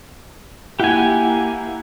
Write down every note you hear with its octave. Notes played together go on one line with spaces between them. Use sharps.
A#3 E4 G4 F#5 G#5